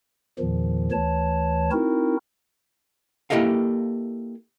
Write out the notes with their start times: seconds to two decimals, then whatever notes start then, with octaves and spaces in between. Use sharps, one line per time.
0.39 E2 A#2 D#3 F3
0.92 D2 E3 C#5 A5
1.72 C4 D#4 E4 F#4 A#4
3.30 A#3 E4 G4 A4 D#5 F5